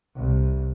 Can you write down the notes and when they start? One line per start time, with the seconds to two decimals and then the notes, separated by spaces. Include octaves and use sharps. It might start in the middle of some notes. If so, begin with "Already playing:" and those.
0.17 C2